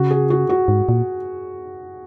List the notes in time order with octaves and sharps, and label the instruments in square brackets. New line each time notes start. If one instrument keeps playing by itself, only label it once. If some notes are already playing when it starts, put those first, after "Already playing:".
Already playing: [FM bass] C#3 [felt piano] F#4
[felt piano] G#4
F#4
F#4
[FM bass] G#2
A#2